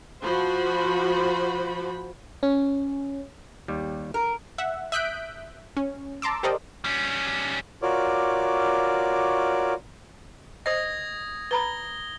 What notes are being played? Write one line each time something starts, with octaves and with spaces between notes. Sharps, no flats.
F3 F#4 C5 B5
C#4
D#2 G3
A#4
E5 F#5
E5 D#6 F#6 G6 B6 D7
C#4
A5 A#5 C6 D6 E6
G4 A4 A#4 C5 D5 D#5
G3 C#4
F4 F#4 A#4 C#5 D5 D6
C5 D#5 D#6 G#6 A#6
B4 A#5 B5 G7